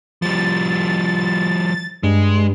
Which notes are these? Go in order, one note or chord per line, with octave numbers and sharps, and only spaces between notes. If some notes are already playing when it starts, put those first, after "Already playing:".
F3 G3 A6
G2 G#3